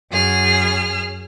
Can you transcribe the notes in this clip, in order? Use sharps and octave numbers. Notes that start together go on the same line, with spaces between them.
F#2 G#4 F6